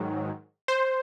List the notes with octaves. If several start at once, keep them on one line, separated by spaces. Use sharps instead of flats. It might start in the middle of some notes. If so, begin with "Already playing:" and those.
Already playing: G#2 D#3 F#3
C5